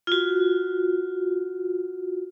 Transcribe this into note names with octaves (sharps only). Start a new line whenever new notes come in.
F4 F#4